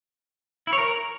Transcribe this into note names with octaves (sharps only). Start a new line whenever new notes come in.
E4
C#5
A#4